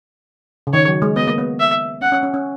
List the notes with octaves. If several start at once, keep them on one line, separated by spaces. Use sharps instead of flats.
C#3
D#3 C#5
F#3
G#3
B3 D#5
A#3
B3
E5
C#4 F#5
C#4
C#4
C#4